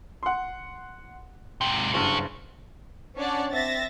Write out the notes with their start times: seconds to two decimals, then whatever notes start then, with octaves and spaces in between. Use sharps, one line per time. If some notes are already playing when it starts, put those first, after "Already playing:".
0.23 F#5 C6
1.61 G#2 C3 G5 F#7
1.94 F#1 G2 C#4 F#4
3.16 C#4 D4 C#5 D5 F#5
3.52 C4 E5 A6 A#6